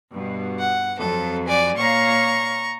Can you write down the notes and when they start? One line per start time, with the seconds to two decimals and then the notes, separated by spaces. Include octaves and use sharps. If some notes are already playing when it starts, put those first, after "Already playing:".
0.12 G2 B2
0.59 F#5
0.99 F2 F#3 A4
1.47 D5 G#5
1.77 A#2 C#5 F5 A#5 C#6